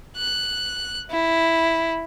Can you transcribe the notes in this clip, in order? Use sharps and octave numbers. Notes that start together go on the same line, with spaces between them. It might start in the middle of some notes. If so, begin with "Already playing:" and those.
F#6
E4